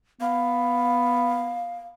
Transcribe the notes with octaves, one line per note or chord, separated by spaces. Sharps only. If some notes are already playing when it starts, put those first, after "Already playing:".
B3 F5